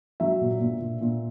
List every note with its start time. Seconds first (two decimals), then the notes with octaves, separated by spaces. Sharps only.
0.20 F#3 E5
0.41 A#2
0.60 A#2
0.80 A#2
1.01 A#2